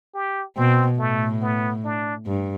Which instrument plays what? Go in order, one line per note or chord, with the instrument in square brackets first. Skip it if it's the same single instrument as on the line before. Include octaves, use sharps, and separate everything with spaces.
[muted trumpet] G4
[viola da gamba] B2 [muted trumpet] C4
[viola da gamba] A2 [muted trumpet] A3
[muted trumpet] B3
D4
[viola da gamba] G2